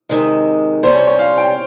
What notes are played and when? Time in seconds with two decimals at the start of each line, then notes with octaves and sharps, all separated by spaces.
0.09 C3 D#3 G#3
0.83 C3 G3 C#4 C5
0.95 C#5
1.07 C#5
1.19 F5
1.38 G5